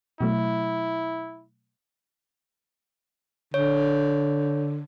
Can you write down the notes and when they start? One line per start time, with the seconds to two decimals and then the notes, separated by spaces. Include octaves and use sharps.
0.21 B2 F#3 A3 E4
3.54 D3 C#5